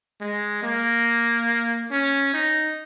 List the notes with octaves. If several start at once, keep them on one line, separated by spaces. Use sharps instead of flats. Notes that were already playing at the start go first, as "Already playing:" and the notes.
G#3
A#3
C#4
D#4